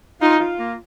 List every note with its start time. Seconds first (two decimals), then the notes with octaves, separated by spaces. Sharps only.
0.21 D#4 F4
0.40 F4
0.59 A#3